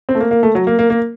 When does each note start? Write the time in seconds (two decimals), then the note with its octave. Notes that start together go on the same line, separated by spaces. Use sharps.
0.09 C4
0.15 A3
0.20 A#3
0.31 A#3
0.43 A3
0.55 F#3
0.67 A#3
0.79 A#3
0.90 A#3